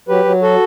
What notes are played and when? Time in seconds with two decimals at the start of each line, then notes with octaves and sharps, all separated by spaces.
0.08 F#3 G4 B4
0.25 F#3
0.42 F#4 A4